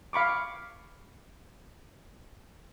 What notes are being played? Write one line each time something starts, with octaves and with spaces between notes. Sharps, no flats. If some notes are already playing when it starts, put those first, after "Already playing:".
F5 B5 C#6 D6